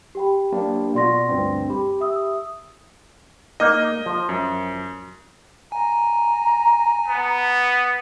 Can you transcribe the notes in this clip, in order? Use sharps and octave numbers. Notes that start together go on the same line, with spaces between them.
G4 G5 B5
F#3 A#3 D4
B2 F4 F#4 D5 C6 A#6
D2 G2 C4
G4 B5
E5 D#6 E6
A#3 D#4 D#5
F3
F#2
G#5 A#5
B3